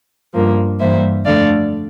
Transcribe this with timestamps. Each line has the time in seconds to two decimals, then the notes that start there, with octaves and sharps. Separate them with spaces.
0.34 G2 F3 A#3
0.80 G2 E3 G3 A#3 C5 E5
1.24 F2 D3 A3 D5 F5